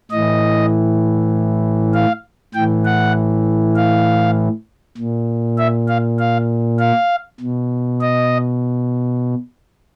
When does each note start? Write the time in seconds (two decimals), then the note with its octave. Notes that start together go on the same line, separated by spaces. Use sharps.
0.11 A2 E3 D#5
1.94 F5
2.55 A2 E3 G5
2.85 F#5
3.76 F5
4.97 A#2
5.58 E5
5.88 F5
6.19 F5
6.79 F5
7.40 B2
8.01 D#5